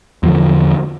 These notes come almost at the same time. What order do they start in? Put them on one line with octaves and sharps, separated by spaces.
E2 F3 D3